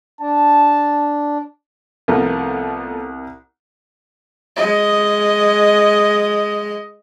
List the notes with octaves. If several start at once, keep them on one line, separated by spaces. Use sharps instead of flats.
D4 A5
C2 F3 A3 B3 A#4
G#3 D#5